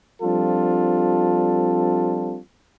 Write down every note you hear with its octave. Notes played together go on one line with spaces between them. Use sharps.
F3 G3 C4 D4 F4 A4